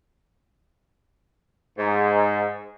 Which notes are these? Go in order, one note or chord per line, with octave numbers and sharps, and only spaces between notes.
G#2